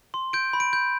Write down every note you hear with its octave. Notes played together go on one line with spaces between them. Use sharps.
C6
G6 D7
B5
D7
G6